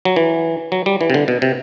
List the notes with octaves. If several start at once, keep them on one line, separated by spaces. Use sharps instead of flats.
F#3
E3
F#3
G3
E3
C3
D3
B2
C3